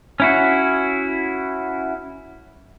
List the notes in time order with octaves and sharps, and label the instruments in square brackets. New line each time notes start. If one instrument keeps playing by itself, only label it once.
[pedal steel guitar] C#4 E4 F#4